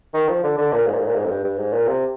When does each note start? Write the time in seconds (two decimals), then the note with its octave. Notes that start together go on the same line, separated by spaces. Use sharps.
0.14 D#3
0.29 F3
0.44 D3
0.58 D3
0.72 A#2
0.87 G#2
0.94 A#2
1.01 G#2
1.08 A#2
1.16 G#2
1.25 F2
1.30 G2
1.44 G2
1.58 G#2
1.73 A#2
1.88 C3